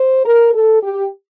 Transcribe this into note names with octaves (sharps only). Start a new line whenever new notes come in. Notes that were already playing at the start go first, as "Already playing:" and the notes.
Already playing: C5
A#4
A4
G4